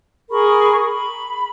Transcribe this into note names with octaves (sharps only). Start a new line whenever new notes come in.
G#4 A#4 B5 C#6
B5